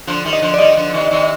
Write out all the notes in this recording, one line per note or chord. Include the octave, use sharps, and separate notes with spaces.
D3 F3
D#3 G3
D#5
D3 F3
D5
D#3 G3 D#5
D#3
D3 F3
C3 D#3
C3 D#3